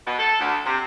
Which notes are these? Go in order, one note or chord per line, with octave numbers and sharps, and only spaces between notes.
B2
A4
D2
C3